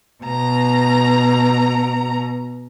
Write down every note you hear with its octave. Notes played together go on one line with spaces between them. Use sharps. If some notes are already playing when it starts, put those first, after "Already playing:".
B2 A#5